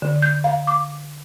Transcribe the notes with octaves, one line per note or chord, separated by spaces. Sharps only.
D3
G6
F5
D6